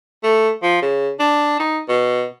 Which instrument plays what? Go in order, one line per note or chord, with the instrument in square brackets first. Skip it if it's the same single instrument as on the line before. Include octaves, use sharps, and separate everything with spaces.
[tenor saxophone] A3
F3
C#3
D4
D#4
B2